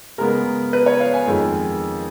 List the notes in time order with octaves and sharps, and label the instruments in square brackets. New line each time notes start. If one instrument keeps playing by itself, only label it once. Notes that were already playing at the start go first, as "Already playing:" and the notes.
[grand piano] C#3 G#3 B3 A#4
B4
C#5
F5
G#5
F2 D#3 G#3